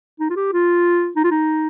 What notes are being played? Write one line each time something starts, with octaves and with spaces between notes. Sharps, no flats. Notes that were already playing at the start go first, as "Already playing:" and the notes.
D#4
F4
G4
F4
D#4
F4
D#4